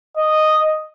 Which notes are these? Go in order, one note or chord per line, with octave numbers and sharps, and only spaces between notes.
D#5